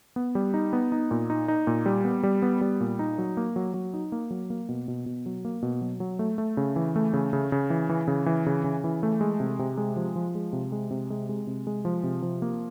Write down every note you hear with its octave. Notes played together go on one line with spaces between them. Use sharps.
B3
G3
D#4
B3
D#4
A#2
D#4
D#4
A#2
G3
B3
G3
B3
G3
A#2
D#4
F#3
A#3
F#3
F#3
D#4
A#3
F#3
A#3
B2
B2
B2
F#3
A#3
B2
F#3
F#3
A3
A3
C#3
E3
A3
C#3
C#3
C#3
E3
E3
C#3
E3
C#3
C#3
E3
A3
G#3
C3
C3
G#3
F3
F3
G#3
C3
G#3
C3
G#3
G#3
C3
G#3
F3
C3
F3
A#3